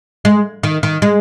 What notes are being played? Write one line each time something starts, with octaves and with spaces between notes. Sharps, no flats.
G#3
D#3
D#3
G#3